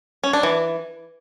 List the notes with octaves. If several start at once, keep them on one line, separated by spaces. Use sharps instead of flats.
C#4
D4
E3